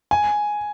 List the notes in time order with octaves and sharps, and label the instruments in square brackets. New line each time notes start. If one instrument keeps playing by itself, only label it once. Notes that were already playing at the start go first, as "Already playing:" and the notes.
[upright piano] G#5